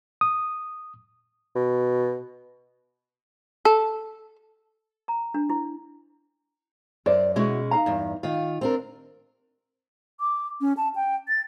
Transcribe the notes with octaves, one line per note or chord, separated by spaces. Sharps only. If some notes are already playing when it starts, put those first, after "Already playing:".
D#6
B2
A4
A#5
D4
E4
F#2 C5 D5
B2 G#3 C#4 E4 F#4
D#4 F5 A#5
E2 G2
D#3 F4 F5
C4 D4 A#4
D6
C#4
A5
G5
A6